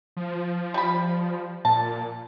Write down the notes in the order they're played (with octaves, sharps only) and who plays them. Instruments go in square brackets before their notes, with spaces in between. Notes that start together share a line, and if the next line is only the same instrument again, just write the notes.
[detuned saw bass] F3
[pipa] G3 B5
[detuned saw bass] A#2 [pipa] A5